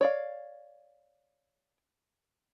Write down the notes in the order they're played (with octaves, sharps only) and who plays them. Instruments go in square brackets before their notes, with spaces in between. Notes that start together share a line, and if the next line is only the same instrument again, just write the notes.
[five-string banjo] C#5 D5 F5